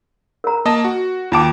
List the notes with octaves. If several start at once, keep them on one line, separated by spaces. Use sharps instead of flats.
A#4 A#5
A#3 D#5 A5
F#4
D#2 F4 G5 A5 D6 D7